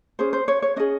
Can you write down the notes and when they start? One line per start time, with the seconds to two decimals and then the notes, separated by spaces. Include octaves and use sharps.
0.19 C#4 G#4 C5
0.33 C5
0.48 C#5
0.62 C#5
0.76 C#4 G#4 D#5